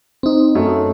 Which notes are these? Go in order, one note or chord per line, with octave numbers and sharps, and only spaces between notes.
C4 D#4
F#2 A3